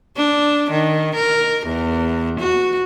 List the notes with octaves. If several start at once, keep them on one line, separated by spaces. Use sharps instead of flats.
D4
D#3
A#4
E2
F#4